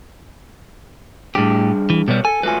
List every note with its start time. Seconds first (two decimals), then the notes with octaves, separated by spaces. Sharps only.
1.35 A2 G3 D4 G4 G#4
1.90 E3
2.08 B2 G3 G4 B4 C#5
2.25 A4 G#5
2.43 F#3 A3 F4 B4 G#5